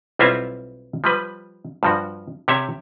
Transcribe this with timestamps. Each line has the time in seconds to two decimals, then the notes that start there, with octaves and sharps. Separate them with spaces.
0.19 B1 G3 C4 E4 F4 E5
1.04 F3 G3 B4
1.83 G2 F3 F#4
2.48 C3 G4 C#5 E5